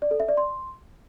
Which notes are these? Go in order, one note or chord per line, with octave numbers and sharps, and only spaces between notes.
D5
A4
E5
D5
C6